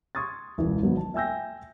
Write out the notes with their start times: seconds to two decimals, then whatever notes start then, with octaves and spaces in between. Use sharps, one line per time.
0.15 C6 C#6 D#6 G#6 A6
0.58 E1 C#2 E3
0.82 G#1 F#3 B3
0.97 A5
1.14 E5 G5 G#5 E6 G6 A#6